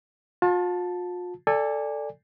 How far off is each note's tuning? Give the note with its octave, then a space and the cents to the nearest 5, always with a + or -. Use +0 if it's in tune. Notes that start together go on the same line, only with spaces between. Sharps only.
F4 +40 A5 +0
A4 +10 D5 +0 G#5 -30